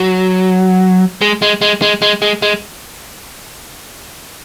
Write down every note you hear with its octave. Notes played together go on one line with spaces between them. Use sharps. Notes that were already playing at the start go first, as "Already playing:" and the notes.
Already playing: F#3
G#3
G#3
G#3
G#3
G#3
G#3
G#3